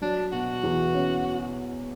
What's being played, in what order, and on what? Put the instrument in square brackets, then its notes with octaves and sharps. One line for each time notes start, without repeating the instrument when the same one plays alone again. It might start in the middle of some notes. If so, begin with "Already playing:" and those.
[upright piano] F#3 [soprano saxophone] D4
[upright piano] B2 [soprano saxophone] F#4
[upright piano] E2
C#4